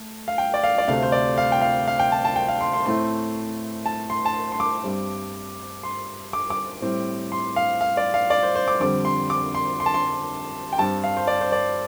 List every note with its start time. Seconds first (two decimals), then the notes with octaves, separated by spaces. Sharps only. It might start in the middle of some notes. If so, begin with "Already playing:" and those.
Already playing: A3
0.28 F5
0.38 G5
0.54 D5
0.64 F5
0.78 D5
0.88 D2 C3 A3 C4 F5
1.02 C5
1.12 D5
1.38 F5
1.52 G5
1.62 F5
1.87 F5
1.99 G5
2.12 A5
2.25 A5
2.36 G5
2.48 F5
2.61 C6
2.74 C6
2.85 A2 A3 C4 C6
3.86 A5
4.10 C6
4.25 A5
4.34 C6
4.52 C6
4.60 D6
4.84 G2 G3 C4
5.83 C6
6.33 D6
6.50 D6
6.82 A2 G3 C4
7.32 C6
7.56 F5
7.81 F5
7.97 D5
8.14 F5
8.30 D5
8.43 C5
8.55 C5
8.68 D6
8.80 F2 D3 G3 C4 D6
9.05 C6
9.30 D6
9.55 C6
9.80 C6
9.86 A5
9.94 C6
10.73 G5
10.78 G2 G3 C4 A5
11.04 F5
11.17 C5
11.27 D5
11.41 C5
11.52 D5